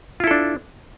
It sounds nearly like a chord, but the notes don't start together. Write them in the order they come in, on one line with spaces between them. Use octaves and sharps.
F4 E4 A4 D4